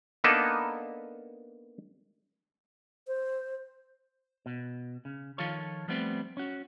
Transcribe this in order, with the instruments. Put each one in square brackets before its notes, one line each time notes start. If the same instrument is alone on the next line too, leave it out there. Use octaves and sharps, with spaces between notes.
[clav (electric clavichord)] A#3 B3 D4 D#4 A4 B4
[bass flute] C5
[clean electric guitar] B2
C#3
D#3 F3 F4 A4 C#5
F3 G3 A3 B3 C4
C#4 F#4